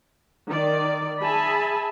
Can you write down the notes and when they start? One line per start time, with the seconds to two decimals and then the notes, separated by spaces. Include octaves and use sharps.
0.49 D#3 D5
1.21 G#4 E5 G#5 A5 B5